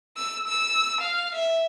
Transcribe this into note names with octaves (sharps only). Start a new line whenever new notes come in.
E6
E6
F5
E5